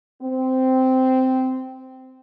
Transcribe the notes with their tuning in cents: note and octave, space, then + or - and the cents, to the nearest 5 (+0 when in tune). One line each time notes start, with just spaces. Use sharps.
C4 -10